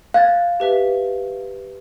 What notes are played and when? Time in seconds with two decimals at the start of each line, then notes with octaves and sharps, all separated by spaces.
0.14 F5 F#6 G#6 A6
0.60 G4 B4 E5